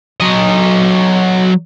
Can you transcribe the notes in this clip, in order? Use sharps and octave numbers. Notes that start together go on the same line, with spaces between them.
F#3 D#5